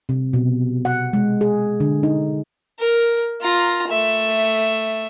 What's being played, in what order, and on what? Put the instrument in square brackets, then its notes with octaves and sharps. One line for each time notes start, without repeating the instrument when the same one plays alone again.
[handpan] C3
B2
F#5
G#3
G#4
D3
D#4
[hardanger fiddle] A#4
F4 A#5
A3 E5